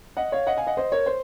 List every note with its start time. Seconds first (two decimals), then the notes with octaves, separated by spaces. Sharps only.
0.17 D#5 F#5
0.32 C#5 F5
0.47 D#5 F#5
0.57 F5 G#5
0.67 D#5 F#5
0.77 C5 D#5
0.92 A#4 C#5
1.06 C5